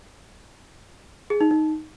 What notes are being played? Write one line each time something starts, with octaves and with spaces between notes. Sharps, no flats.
G#4
D#4
D#4